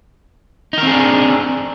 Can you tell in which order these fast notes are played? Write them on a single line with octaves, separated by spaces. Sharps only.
D#4 A#4 C4 G#4 D4